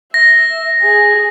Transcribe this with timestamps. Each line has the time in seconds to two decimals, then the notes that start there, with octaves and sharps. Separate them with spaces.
0.14 E5 A#6
0.82 G#4